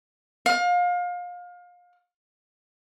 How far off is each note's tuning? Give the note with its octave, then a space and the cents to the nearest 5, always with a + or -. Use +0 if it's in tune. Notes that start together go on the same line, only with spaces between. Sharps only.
F5 +30